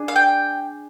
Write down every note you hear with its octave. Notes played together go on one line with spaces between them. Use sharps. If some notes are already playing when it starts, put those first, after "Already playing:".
Already playing: D4 G#4
F5
G5